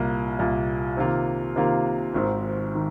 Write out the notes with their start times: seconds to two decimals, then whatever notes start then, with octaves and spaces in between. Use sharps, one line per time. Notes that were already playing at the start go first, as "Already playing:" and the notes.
Already playing: C2 A#2 A#3
0.39 C2 A#2 A#3
0.97 C3 D#3 A#3 F4
1.56 C3 D#3 A#3 F4
2.14 G#1 G#2 D#3 C4
2.75 D#3